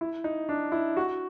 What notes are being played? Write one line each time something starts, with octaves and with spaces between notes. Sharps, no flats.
E4
D#4
D4
E4
F#4